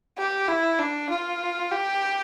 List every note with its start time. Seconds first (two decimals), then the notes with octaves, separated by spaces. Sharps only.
0.18 G4
0.47 E4
0.79 D4
1.10 F4
1.71 G4